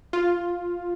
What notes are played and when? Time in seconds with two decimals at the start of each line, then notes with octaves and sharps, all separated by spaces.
0.13 F4